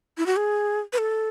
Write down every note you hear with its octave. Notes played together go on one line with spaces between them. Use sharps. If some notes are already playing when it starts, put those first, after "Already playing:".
E4
F#4
G#4
B4
A4